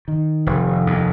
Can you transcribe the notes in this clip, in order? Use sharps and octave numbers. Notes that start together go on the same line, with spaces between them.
D#3
F1
D#2